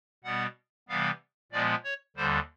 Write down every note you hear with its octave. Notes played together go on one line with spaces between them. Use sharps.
B2 G3 B3 F#5
C3 E3 G3 B3 F5
A#2 F3 G#3 B3 D5
C#5
D#2 D3 G3 C5